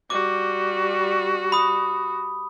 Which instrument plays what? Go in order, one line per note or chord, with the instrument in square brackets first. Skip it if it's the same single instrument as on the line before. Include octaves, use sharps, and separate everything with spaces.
[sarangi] G3 [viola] F#4 [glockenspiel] D6
[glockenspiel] B5 D#6